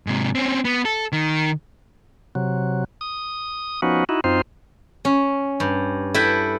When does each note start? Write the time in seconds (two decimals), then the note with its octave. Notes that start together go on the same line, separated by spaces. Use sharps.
0.07 G#2 C3
0.35 C4 C#4
0.65 B3
0.85 A4
1.13 D#3
2.35 C3 F#3
3.01 D#6
3.82 F3 B3 C#4 D#4 F#4
4.09 D#4 E4 F#4
4.24 F#2 C4 D#4 F4 C5
5.05 C#4
5.60 G2
6.14 E4 A4 B4 G5 A5